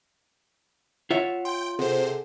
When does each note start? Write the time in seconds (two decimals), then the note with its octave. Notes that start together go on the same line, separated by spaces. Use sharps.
1.10 F4 C#5 E5 F#5
1.45 G5 C6
1.79 C3 G#4 A4 C5 F#5